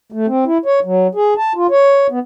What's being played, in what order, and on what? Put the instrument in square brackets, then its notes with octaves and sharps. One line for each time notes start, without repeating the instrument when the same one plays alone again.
[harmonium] A3
C4
E4
C#5
F#3
G#4
A5
F4
C#5
B3